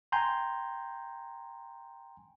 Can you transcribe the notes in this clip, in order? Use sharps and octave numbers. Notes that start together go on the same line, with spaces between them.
G5 G#5 A#5 C6 G6